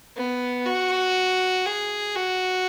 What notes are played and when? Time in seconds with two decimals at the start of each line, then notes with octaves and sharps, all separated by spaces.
0.17 B3
0.66 F#4
1.66 G#4
2.16 F#4